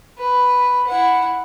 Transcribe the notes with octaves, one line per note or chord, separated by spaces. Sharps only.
B4
E4 F#5